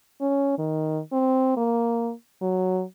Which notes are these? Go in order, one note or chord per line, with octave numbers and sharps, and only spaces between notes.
C#4
D#3
C4
A#3
F#3